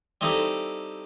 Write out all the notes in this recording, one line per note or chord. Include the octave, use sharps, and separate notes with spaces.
G3 C4 D#4 E4 A4